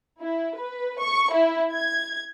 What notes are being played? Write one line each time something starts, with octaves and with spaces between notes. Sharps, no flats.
E4
B4
C#6
E4
G#6